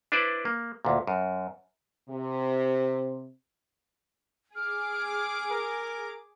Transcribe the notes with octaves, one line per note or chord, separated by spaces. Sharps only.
D4 E4 B4 C5 D5
A#3
D2 A#2
F#2
C3
G#4 D6 F6
A#4